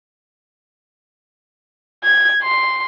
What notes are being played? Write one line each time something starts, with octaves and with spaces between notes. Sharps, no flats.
G#6
C6